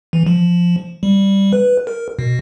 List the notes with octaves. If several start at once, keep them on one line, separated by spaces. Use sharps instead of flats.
E3
F3
G3
B4
A#4
B2